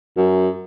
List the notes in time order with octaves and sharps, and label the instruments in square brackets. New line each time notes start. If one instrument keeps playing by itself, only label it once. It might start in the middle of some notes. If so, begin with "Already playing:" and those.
[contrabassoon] F#2